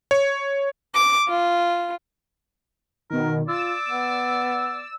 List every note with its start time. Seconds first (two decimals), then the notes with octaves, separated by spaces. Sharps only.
0.11 C#5
0.94 D6
1.28 F4
3.10 B2 D#3 A#4
3.48 F4 D5 E6
3.89 B3